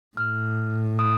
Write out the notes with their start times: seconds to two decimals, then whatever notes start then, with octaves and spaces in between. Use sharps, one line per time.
0.17 A2 F6
0.99 D#6